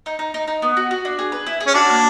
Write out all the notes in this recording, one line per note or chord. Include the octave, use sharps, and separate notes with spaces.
D#4
D#4
D#4
D#4
B3
F#4
F#4
D4
G#4
B4
E4
G#4
C#4
D4 F#4
A#3